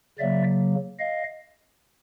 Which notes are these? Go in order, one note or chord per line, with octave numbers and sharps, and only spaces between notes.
C#3 F#3 A#3 D5 E5
D#5 F5